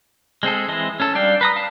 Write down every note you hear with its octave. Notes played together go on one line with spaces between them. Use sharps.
G#3 C4 G#4 A4
E3 G#3 C4 D#5
C#4 A4
G3 D4 D5 F5 G5
B4 A#5 D#6
F5 A5